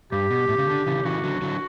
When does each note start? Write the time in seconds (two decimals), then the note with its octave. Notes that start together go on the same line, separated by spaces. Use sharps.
0.12 G2 G4
0.31 B2
0.49 A2
0.58 C#3
0.68 D3
0.87 C#3 E3
1.05 C#3 E3 F#4
1.24 D3 F#3
1.42 D3 F#3